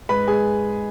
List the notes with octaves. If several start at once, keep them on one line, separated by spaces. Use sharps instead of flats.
G#2 B4 B5
G#3 G#4 G#5